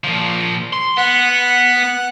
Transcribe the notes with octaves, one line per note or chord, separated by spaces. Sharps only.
A#2 F3
C6
B3 F#5